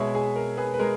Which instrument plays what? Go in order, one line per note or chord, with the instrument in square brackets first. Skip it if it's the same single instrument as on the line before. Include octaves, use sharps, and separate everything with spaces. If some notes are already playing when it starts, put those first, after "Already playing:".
Already playing: [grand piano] B2 G#3 C#5 E5
G#4
A#4
G#4 B4
B4
G#3 A#4